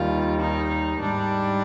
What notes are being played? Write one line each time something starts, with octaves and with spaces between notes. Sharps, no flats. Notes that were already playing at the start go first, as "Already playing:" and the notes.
Already playing: D#2 D#3 G3 F4
D#4
G#2 G3 D4